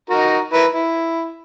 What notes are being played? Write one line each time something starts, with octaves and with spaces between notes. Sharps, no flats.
D#4 F#4 A#4
E4 A#4 B4
E4